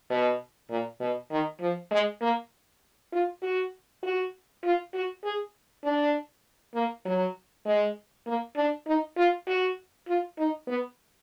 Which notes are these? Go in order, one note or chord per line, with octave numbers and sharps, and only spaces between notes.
B2
A#2
B2
D#3
F3
G#3
A#3
F4
F#4
F#4
F4
F#4
G#4
D4
A#3
F#3
G#3
A#3
D4
D#4
F4
F#4
F4
D#4
B3